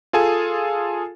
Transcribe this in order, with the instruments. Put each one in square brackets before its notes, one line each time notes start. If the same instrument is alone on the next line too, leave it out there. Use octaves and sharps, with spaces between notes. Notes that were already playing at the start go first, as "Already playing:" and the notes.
[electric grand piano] F4 G#4 A4 G#5